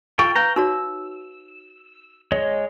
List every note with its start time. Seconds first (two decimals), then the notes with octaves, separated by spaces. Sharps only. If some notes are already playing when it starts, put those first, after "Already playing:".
0.19 F4 A4 G5 C#6
0.36 B4 F5 G5 A#5
0.56 D#4 F#4 C#5 E6
2.32 G#3 C#5 D#5